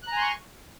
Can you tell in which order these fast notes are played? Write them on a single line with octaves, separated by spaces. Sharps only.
F#6 A#5 G#5 C6 C#6